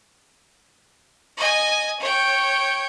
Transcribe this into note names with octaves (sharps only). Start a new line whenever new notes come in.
D#5 G#5
C#5 G5